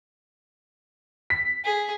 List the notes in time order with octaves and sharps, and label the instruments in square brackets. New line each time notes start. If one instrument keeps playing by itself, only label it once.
[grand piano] B6
[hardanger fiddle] G#4